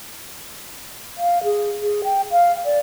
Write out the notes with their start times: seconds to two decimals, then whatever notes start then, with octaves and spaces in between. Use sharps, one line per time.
1.17 F5
1.44 G#4
1.82 G#4
2.04 G5
2.31 F5
2.65 D5